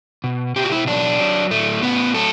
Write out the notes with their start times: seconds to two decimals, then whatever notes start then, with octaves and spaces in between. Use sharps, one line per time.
0.24 B2
0.56 B2 G4
0.64 F#4
0.72 E4
0.87 F#3 D4
1.19 F#3
1.51 A2 A3
1.82 A2 B3
2.14 F#3 A4